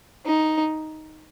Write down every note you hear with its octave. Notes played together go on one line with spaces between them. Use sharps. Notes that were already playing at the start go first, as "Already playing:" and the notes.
D#4